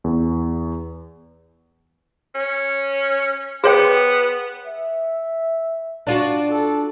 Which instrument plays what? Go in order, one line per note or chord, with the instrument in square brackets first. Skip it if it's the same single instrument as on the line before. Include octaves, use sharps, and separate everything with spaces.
[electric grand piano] E2
[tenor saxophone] C#4
[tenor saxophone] B3 [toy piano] G#4 C#5 G5
[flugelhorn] E5
[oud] D4 F4 F#4
[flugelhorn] A4